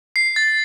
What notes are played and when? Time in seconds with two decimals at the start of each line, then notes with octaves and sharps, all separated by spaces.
0.16 C7
0.36 A6